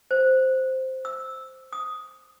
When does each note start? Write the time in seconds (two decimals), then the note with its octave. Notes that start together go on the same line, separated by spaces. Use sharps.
0.11 C5
1.05 E6
1.73 D#6